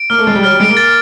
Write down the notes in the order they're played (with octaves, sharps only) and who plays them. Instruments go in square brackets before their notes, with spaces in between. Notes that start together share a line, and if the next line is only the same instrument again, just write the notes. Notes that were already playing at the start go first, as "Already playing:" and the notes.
Already playing: [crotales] D7
[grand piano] A#3 [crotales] F6
[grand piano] A3
[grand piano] G#3 [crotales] A6
[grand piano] G3
[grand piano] F#3 [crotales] F6
[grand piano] G3
[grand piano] G#3 [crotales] D7
[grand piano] A#3
[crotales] A6